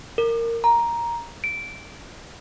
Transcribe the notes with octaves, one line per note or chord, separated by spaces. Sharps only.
A#4
A#5
D7